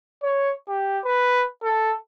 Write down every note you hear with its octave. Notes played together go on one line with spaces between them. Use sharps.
C#5
G4
B4
A4